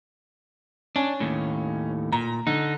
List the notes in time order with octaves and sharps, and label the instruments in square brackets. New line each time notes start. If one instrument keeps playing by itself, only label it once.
[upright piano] C#4 [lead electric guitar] D4
[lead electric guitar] D#2 A2
[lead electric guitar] A#2 [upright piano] A#5
[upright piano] D3 [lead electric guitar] D#4